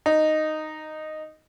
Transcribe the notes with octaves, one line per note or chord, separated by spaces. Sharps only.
D#4